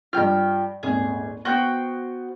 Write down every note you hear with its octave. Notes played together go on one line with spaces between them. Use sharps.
G2 F3 G5 F6
D#1 G#1 G#4
B3 F#4 C5 G5